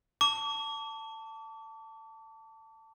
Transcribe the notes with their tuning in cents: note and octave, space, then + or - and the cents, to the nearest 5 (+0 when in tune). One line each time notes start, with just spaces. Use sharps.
A5 +15 D6 -40